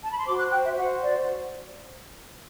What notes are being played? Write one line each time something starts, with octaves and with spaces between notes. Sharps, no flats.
A5
B5
C6
F#4 C5 D6
F#6
G5
E5
F#4 C5 F#5
D5